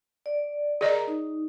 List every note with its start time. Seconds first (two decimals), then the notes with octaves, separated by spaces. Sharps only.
0.26 D5
0.81 G#4 A#4 D5 D#5 A#5
1.08 D#4